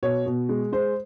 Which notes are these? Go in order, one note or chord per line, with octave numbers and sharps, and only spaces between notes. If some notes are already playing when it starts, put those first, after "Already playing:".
B2 C#5
B2
G#3
G#3 C5